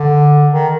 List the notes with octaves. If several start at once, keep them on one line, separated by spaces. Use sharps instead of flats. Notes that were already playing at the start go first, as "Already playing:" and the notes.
Already playing: D3
D#3